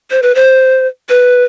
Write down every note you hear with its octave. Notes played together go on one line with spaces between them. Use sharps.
C5
B4
C5
B4